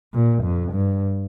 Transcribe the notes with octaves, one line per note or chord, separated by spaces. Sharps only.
A#2
F2
G2